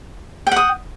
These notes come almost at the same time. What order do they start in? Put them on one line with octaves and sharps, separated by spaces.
G5 F#5 D#6